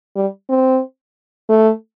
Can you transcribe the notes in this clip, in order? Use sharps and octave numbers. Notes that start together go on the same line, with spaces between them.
G3
C4
A3